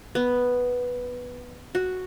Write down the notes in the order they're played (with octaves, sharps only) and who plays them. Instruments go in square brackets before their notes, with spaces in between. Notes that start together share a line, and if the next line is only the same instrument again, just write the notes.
[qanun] B3
F#4